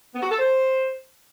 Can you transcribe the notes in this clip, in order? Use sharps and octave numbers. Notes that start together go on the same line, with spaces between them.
B3
F#4
A4
C5